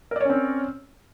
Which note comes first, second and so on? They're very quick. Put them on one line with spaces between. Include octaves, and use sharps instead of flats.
A#4 D5 C#5 C#4 C4